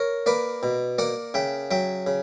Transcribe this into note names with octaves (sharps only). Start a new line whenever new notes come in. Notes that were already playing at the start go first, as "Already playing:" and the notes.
Already playing: A#4 C#5
A#3 B4 D5
B2
A#3 D5 F#5
C#3 E5 G5
F#3 E5 G5
C#3